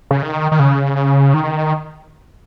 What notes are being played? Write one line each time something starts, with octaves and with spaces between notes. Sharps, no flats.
C#3
D#3
D#3
C#3
D#3